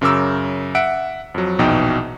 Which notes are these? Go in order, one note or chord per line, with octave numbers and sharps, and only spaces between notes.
F#2 C#3 A#4 D6 E6
E5 F#5 D7
F2 F#3
A#1 E2 B2 D#4 G5